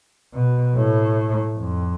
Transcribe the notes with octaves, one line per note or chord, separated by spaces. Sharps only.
B2
A2
F2